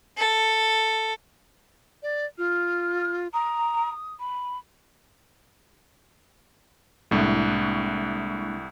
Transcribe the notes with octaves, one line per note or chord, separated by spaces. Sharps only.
A4
D5
F4 F6
A#5 D#6
B5
C2 A2 G#3 A#3 D4